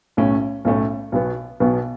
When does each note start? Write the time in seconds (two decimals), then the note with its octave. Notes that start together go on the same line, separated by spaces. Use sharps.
0.17 B1 A2 A3 C#4
0.65 B1 A2 A3 C#4
1.12 B1 B2 F#3 B3
1.60 B1 B2 F#3 B3